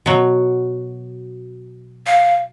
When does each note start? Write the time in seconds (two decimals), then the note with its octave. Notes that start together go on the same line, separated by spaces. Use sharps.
0.06 B2 F#3
2.07 F5